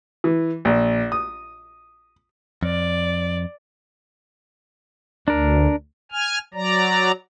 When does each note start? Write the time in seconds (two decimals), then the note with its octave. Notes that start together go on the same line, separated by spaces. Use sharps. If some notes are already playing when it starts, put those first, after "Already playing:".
0.24 E3
0.65 A#1
1.12 D#6
2.63 F2 D5
5.28 D2 D4 A#4
6.12 G#5 F6
6.54 F#3 D5 A#5